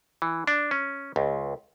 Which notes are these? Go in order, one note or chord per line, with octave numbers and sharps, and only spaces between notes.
E3
D4
C#4
C#2